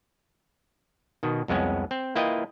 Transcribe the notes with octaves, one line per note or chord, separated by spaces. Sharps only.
B2 D#3
C2 F2 G#3 B3 C#4
C4
A#3 E4 F4 B4 D#5 G5